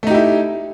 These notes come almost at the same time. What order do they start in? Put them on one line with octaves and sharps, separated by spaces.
A3 D#4 G4 E4